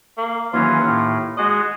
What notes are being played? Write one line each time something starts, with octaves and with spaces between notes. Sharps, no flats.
A#3
D#2 E3 F#3 C#4 F4
A2
G#3 F#4 G#4 D#5